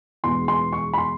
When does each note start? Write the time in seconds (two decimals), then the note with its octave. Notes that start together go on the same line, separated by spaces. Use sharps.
0.24 E2 B2 G#3 C6
0.48 C6
0.73 C#6
0.93 B5
0.98 C6